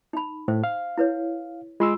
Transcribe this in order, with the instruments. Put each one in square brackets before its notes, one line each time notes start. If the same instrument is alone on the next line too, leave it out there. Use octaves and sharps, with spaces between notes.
[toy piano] D#4 B5
[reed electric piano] A2 [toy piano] C5
[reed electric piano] F5
[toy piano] E4 B4 C#5
[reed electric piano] G#3 C6 E6 [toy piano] F4